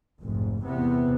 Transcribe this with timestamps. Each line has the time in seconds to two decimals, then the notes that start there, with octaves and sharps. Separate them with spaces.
0.20 F1 A#1 G#2
0.63 E2 C3 B3